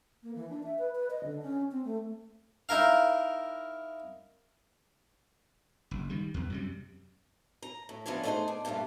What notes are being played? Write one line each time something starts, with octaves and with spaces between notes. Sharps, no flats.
A#3
E3
D4
E5
B4
B4
D#5
D3
C#4
C4
A3
D#4 E4 A#4 F5
F#1
D#3 G3
E2
F#2 C3 G3
A#5
A2
E3 F3 B3 C#4 D4 C#5
A3 B3 D#4 E4 G#4 C5
D4
G2 A#2 E3 A3 B3